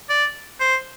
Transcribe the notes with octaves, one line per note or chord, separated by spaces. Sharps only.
D5
C5